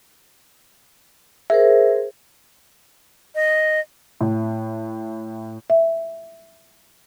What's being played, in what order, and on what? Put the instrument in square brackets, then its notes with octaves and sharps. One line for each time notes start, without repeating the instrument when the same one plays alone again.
[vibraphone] G#4 A#4 C5 [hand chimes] E5
[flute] D#5
[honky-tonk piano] A2
[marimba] E5